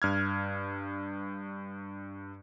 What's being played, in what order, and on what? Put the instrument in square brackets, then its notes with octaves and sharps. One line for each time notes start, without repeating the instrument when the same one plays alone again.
[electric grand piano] G2 F6 G#6